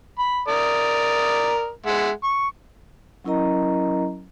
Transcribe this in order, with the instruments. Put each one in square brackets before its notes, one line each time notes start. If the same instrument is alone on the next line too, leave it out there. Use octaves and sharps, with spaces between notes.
[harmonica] B5
A#4 D5 D#6
G#3 E5 F#5
C#6
[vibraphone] F#3 C#4 E4 A#4 D#5 A#5